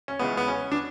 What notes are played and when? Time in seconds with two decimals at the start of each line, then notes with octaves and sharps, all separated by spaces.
0.08 C#4
0.19 C#2 C#3 E3 B3
0.37 B3
0.48 C#4
0.72 D4